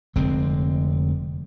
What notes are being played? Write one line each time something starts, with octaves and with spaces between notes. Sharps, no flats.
F1 D3 G#3 C4